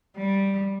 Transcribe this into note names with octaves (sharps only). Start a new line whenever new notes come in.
G3